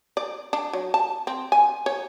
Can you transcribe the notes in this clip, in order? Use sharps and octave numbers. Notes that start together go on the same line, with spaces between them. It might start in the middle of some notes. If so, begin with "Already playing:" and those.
D5
D4
F#3
A5
C4
G#5
C#5